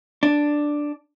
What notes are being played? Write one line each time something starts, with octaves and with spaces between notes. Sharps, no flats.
D4